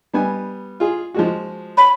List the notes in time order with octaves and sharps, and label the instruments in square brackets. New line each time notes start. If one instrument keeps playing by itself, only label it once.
[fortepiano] G3 B3 G#5
F4 G#4
F3 G#3 F#4
[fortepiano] C#5 [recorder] B5